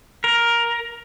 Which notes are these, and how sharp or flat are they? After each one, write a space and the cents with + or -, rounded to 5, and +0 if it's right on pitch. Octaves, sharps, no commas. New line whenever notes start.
A#4 +10